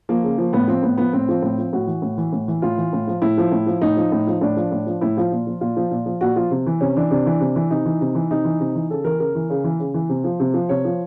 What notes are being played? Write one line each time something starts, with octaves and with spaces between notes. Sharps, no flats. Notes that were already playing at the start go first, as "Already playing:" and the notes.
F3 A#3
C#3
F3
A2 B3
F3 C4
A2 B3
F3 B3
A2 C4
F3
A2
F3
A2 F#4
E3
A2
E3
A2
E3
A2 F4
E3
A2
F3
A2 E4
F3
A2
F3
A2 D#4
F3
A2
F3
A2 D4
F3
A2
F3
A2 E4
F3 F4
A#2
F3
A#2 F4
F3
A#2
F3
A#2 F#4
F3 F4
C3
E3
C3 C#4
E3 D4
C3 D4
E3
C3
E3
C3 D#4
E3
C3
E3
C3 D#4
E3
C3
E3
C#3 A4
E3 A#4
C#3 A#4
E3
C#3
E3
C#3
E3
C3
F3
C3
F3
C3 C#5
F3